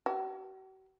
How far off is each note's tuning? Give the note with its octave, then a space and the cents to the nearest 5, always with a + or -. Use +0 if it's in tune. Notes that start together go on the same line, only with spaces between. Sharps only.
F#4 +45